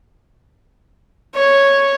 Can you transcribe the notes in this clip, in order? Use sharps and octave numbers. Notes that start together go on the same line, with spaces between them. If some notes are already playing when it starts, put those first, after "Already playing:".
C#5